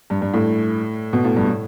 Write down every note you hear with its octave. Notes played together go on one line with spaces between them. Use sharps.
G2
G2
A2
B2
A2
G2
A2